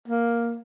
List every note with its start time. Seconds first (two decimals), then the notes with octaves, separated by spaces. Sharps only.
0.08 A#3